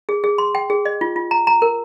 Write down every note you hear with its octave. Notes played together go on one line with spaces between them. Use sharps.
G#4
G#4
C6
G5
G#4
D#5
F4
F4
A#5
A#5
A#4